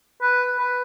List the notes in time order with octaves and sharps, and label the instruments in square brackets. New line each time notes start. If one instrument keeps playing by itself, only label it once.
[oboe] B4
B4